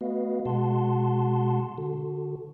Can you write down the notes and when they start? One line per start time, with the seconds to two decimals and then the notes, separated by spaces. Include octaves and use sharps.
0.01 A3 B3 F#4 B4 D#5 F5
0.46 B2 G#3 F#4 F#5 A5 C6
1.78 D3 F#4 A4